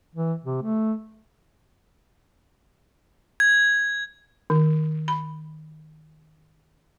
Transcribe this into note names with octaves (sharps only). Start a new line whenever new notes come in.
E3
C3
A3
G#6
D#3
B5